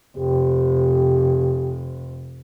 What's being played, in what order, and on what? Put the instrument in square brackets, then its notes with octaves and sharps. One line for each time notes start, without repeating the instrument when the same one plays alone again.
[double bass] F1 [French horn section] G4